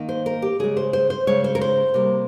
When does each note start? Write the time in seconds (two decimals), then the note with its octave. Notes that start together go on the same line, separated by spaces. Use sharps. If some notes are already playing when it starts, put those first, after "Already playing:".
Already playing: D#3 A#3
0.09 C5
0.26 A#4
0.42 G4
0.59 C#3 G#3 G#4
0.77 C5
0.93 C5
1.10 C5
1.27 C#3 G#3 C#5
1.44 C5
1.55 A#4
1.61 C5
1.94 C3 G3 A#3